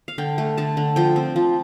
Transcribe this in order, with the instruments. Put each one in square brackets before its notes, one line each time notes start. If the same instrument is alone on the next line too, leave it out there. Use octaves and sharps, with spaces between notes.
[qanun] F5
D3 G5
A3
D3 A5
D3
F3 G5
C4
F3